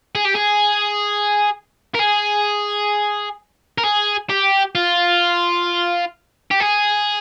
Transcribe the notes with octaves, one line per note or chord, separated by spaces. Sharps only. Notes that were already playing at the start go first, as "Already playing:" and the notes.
G#4
G4
G#4
A#4
G#4
A#4
G#4
G4
F4
G4
G#4